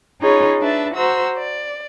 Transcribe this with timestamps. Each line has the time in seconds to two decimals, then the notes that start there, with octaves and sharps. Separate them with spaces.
0.21 C#4 D#4 F4 G#4 C#5 B5
0.60 D4 B4 E5 A5
0.95 F#4 C5 A#5 E6
1.37 D5